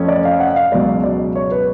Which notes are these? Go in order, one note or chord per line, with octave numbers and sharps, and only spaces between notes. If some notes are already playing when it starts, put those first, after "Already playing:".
Already playing: F2 F3 A3 C#4
D5
F5
F#5
F5
C#2 B2 F#3 D5
D5
C#5
B4